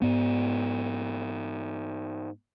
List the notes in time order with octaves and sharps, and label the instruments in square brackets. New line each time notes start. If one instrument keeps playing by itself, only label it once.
[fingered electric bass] G#2 B3